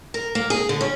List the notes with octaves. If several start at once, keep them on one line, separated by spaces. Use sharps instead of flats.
A#4
A#3
G#4
D3
C#4